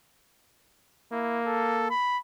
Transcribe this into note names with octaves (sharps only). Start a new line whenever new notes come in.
A#3 E4
A4
B5